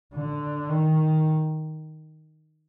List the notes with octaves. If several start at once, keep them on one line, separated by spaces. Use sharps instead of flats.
D3
D#3